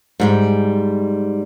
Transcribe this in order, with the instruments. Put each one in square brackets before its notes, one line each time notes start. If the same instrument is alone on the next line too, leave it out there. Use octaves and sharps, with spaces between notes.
[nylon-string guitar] G#2 G3 G#3